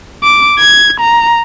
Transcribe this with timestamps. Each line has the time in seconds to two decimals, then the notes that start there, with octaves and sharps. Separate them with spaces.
0.24 D6
0.59 G#6
1.00 A#5